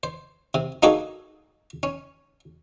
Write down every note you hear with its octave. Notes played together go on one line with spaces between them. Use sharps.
C5
C3
A#3 D4 D#4 F#4 G#4 A4
C#4